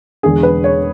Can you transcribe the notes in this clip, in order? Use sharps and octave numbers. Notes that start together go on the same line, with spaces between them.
E1 E2 D3 G#4
B4
C#5